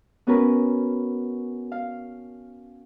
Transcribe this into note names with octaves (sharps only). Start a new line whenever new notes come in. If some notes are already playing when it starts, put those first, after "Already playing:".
B3 C#4 F#4 A#4 B4
F5